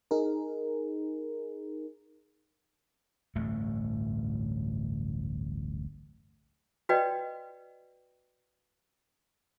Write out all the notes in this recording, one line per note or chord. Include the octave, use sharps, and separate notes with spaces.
D#4 G#4 A#4
D1 A1 G2 A3
F#4 B4 D5 D#5 G5